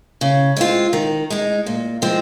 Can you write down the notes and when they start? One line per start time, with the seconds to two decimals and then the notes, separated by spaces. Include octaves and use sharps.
0.21 C#3
0.56 G#3 C4 F4
0.93 D#3
1.30 G#3 D#4
1.66 A#2
2.02 F3 G#3 C4